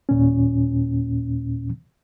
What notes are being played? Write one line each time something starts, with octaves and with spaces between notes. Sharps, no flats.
D#2 A#2 C#4